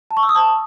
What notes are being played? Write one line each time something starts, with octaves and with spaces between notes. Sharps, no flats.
A5
C#6
E6
D#6
A5